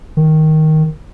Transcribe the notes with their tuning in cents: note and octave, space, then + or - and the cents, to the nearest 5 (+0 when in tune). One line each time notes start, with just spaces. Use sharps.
D#3 +5